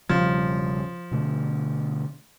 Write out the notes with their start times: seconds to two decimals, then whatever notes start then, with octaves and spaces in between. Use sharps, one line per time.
0.09 E1 C#3 F3 G3
1.11 B2 D3 A3